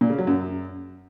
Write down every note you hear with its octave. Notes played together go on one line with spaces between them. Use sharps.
A#2
C#3
F#3
F#2